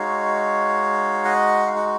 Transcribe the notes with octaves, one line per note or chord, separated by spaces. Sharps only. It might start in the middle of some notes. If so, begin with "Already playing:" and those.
Already playing: G#3 D#4 F#4 C#5 F5
D#5 F#5
F5
F#5